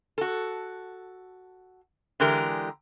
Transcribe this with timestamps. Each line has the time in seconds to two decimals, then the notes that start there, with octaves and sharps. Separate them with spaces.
0.18 F#4 A4
2.20 D3 E3 G#3 G4 A#4